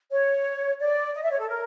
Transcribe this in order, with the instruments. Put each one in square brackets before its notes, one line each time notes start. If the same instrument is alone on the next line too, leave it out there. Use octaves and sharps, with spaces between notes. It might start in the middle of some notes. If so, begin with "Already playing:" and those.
[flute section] C#5
D5
D#5
E5
C#5
A4
A#4